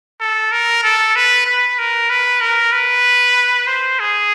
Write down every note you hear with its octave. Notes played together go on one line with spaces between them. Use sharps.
A4
A#4
A4
B4
B4
A#4
B4
A#4
B4
C5
G#4